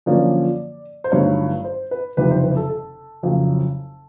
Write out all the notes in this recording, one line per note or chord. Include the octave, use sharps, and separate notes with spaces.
F#2 D3 F3 A#3 C#4 D5
C5
G1 G2 D#3 F#3 A3 C#5
C5
B4
F#1 F2 C3 D#3 G3 B4
C5
B4
A4
A4
F#1 F2 C#3 F#3